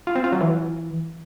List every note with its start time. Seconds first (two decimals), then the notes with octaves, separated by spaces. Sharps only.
0.07 F4
0.15 C4
0.24 F4
0.32 F#3
0.41 E3